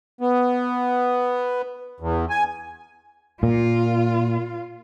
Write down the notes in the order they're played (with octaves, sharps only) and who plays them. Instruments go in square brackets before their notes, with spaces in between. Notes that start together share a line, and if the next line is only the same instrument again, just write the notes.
[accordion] B3
E2
G#5
[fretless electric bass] A#2 [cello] F4